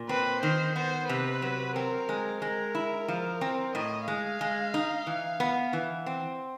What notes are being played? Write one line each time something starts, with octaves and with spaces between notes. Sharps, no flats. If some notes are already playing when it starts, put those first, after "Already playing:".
Already playing: A#2
C4 B4
D#3 C5
B3 C5
C3 B4
F#3
C4 A#4
G#3
G#3 A#4
E4
F3
C4
A2 D#5
G#3 F5
G#3
D#4
E3
B3
E3
C4